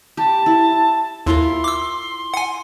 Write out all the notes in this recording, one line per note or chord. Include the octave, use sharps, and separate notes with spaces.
G4 A5
E4
D#2 E4 F4 A#4 C6
D6 E6
F#5 G#5